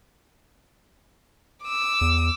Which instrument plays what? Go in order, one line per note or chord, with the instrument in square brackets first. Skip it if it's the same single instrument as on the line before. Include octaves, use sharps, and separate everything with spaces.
[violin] D6 E6
[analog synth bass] E2